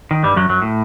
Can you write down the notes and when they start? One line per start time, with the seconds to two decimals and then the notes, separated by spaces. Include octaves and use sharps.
0.11 D#3
0.23 G2 G3
0.36 F#2 F#3
0.49 F#2 F#3
0.62 A2